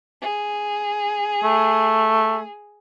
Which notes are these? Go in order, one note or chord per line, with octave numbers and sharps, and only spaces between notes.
G#4
A3